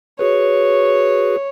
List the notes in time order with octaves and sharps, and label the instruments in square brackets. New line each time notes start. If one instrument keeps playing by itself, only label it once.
[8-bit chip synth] F#4 G#4 B4 [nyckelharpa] C#5